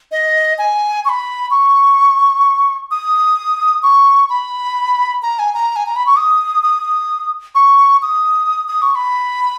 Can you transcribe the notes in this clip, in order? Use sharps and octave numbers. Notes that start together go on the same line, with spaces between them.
D#5
G#5
C#6
B5
C#6
D#6
C#6
B5
A#5
G#5
A#5
G#5
A#5
B5
C#6
D#6
D#6
C#6
D#6
D#6
C#6
B5